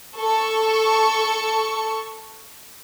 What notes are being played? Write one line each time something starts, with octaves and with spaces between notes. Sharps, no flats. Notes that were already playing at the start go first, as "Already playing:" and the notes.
A4 C#6